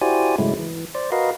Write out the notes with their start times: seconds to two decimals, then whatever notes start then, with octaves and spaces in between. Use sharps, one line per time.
0.01 E4 F#4 G4 C5 D5 G#5
0.38 G#2 C#3 F#3 G#3 A3 E4
0.59 E3
0.95 C5 D5
1.12 F#4 A#4 B4 D#5 F5